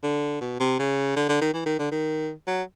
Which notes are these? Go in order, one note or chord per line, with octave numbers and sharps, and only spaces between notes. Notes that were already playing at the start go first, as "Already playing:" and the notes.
D3
B2
C3
C#3
D3
D3
D#3
E3
D#3
D3
D#3
F#3